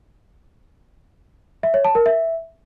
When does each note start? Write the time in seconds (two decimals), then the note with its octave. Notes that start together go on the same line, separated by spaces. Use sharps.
1.63 E5
1.74 C#5
1.85 A5
1.95 A#4
2.06 E5